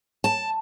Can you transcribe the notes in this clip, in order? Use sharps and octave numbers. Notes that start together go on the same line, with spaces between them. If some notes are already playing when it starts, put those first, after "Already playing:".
A5